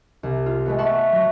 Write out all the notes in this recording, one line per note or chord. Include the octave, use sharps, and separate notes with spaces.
C2
F4
G#3 A3 B3
E5 F#5 A5 C6 C#6
F#3 A#6